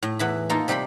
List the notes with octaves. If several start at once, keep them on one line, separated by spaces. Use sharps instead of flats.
A2
E2 E3 B5
A#3 D#4 F4 A4
C3 G3 G4 B5 C6